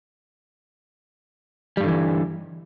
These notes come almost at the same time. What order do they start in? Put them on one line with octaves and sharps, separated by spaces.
G3 G2 D3 E3